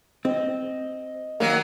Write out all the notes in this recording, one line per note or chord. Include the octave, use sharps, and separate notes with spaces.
C4 D#5
D#3 F#3 A#3